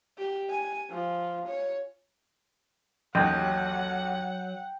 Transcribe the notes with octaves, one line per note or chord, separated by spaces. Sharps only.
G4
G#5
F3
C#5
A1 D#2 F#3 D#4 F#5 G5